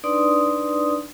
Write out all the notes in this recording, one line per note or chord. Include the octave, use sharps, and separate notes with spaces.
D4 D#4 B4 D5 C6 D#6